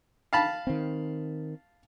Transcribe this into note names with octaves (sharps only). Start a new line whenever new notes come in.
F5 A5 B5
D#3 C4